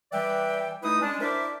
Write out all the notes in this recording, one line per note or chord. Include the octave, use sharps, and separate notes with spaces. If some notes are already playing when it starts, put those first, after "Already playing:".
E3 G3 B4 D5 E5 G5
A3 D#4 E4 B4 D#6
G#3 C#4 D4
D4 E4 A#4 C5 D5 E5